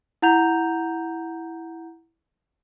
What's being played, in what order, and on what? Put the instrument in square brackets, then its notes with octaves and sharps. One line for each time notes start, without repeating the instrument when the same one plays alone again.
[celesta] E4 F#5 A#5 G6 F7